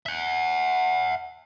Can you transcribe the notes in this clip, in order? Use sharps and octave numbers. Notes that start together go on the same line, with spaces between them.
E5 F#5